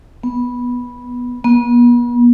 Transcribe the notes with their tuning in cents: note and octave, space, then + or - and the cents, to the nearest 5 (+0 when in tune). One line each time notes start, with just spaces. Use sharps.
B3 -10
B3 -40